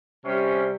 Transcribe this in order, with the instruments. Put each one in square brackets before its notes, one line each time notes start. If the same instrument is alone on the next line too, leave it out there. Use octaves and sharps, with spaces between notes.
[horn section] C3 G3 C#4